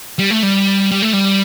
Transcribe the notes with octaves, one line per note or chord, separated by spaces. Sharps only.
G3
A3
G3
G3
A3
G3